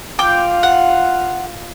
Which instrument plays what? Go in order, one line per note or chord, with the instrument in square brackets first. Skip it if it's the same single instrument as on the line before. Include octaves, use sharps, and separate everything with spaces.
[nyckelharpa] F4 F5 [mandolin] G5 D6
[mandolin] F#5